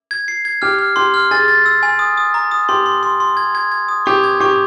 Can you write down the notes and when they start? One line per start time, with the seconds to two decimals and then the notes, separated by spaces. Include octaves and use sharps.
0.11 G#6
0.28 C7
0.45 G#6
0.62 G4 F6
0.79 F6
0.96 G4 C6
1.14 F6
1.31 G#4 A6
1.48 A6
1.66 E6
1.83 G#5
1.99 D#6
2.17 D#6
2.34 A#5
2.51 D#6
2.69 G4 C6
2.86 C6
3.03 C6
3.20 C6
3.37 G#6
3.55 G#6
3.72 G#6
3.88 D#6
4.06 G4 C#6
4.24 G#6
4.40 G4 C#6